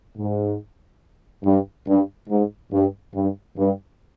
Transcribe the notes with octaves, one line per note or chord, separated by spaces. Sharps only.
G#2
G2
G2
G#2
G2
G2
G2